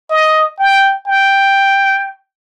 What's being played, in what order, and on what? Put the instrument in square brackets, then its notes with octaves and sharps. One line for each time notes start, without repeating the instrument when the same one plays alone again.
[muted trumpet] D#5
G5
G5